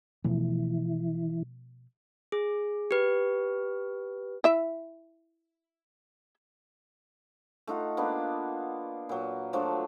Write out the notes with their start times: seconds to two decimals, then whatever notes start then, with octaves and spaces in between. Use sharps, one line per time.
0.24 B2 E3 F3 A3
2.32 G#4
2.91 G4 B4
4.44 E4 E5
7.67 A3 D#4 F4 F#5
7.97 A#3 B3 D4
9.09 A#2 F#3
9.53 F3 F#3 A3 D4